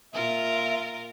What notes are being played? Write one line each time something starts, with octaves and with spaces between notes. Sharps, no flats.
A#2 F4 A#4 E5